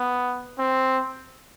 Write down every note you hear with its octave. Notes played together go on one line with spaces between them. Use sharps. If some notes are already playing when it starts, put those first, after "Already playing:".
Already playing: B3
C4